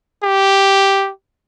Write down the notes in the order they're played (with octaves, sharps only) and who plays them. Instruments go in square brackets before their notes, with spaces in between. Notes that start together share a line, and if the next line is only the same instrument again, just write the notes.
[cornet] G4